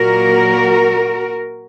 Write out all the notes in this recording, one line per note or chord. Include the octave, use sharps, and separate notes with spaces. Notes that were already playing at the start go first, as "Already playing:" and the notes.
Already playing: A#2 F#3 A#3 F#4 A#4